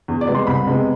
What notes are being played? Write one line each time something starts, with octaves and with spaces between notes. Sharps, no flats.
E2
D5
C3 G#3 B3
C6
C2 B5
C3 G#3 B3